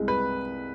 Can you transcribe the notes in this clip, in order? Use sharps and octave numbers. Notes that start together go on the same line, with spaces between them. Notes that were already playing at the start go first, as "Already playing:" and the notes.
Already playing: C2 G#3
B4